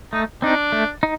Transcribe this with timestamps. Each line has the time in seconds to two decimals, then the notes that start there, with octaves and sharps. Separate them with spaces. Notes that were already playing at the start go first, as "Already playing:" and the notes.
0.13 A3 D#4
0.42 C4 D4 D#4
0.72 A3
1.03 D#4